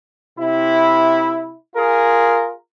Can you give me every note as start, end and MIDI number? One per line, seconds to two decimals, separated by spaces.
0.38 1.54 48
0.38 1.54 64
1.75 2.52 65
1.75 2.52 68
1.75 2.52 70